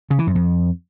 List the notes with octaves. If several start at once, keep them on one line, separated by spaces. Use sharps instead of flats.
C#3
E3
F#2
F2